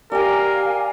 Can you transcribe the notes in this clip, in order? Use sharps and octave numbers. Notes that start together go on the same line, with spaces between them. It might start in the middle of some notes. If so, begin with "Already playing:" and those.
G4 A#4 D5 F5 G5 G#5